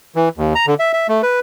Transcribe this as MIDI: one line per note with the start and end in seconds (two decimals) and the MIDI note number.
0.15 0.29 52
0.38 0.53 39
0.55 0.66 82
0.67 0.74 50
0.79 0.92 76
0.93 1.07 76
1.08 1.22 57
1.23 1.40 71